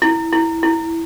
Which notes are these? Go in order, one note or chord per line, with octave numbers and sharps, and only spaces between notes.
E4
E4
E4